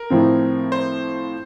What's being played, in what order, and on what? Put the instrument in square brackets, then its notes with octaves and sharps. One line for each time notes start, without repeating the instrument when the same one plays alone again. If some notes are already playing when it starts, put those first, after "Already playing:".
Already playing: [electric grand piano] A#4
[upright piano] A2 F3 C4
[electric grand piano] C5